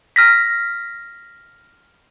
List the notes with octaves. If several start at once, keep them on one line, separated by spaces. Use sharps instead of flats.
F6 A#6 B6